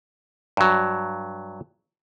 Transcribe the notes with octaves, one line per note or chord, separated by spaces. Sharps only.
G2 F#3